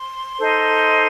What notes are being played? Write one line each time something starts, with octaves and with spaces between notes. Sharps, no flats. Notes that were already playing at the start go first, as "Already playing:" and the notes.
Already playing: C6
D#4 A4 C5